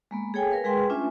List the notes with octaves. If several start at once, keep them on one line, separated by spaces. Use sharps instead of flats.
G#3 A#3 B3
G#4 A4 C#5 G5 G#5
A#4 B4 F5 G#5
G#3 G#4 B4 G5 C6
A3 C#4 D4 F4 E5 G#5